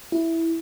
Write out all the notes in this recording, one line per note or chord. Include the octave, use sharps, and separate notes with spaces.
E4